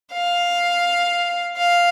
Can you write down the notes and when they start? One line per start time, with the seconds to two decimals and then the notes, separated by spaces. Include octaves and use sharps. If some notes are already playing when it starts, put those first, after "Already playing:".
0.13 F5
1.57 F5